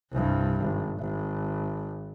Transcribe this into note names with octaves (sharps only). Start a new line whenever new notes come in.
C2 G2
G#1
G#1